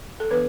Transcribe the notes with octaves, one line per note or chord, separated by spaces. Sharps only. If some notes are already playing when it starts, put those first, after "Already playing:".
A4
E3 B3 D4 B4